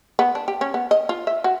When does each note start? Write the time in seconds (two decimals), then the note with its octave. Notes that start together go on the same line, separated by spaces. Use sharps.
0.19 B3
0.35 D4
0.48 G4
0.61 C#4
0.74 B3
0.91 D#5
1.09 F4
1.27 E5
1.44 F#4